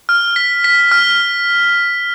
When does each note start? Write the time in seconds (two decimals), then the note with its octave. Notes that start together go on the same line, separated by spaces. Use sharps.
0.09 F6
0.36 B6
0.64 B6
0.91 F6